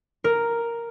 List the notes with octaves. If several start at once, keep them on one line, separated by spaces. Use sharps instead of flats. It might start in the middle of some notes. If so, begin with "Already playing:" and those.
A#4